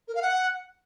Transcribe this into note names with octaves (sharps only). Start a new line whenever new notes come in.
A#4
F5
F#5